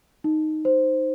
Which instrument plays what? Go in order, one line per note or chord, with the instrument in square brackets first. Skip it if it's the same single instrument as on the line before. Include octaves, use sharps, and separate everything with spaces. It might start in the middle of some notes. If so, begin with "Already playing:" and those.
[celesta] D#4
C5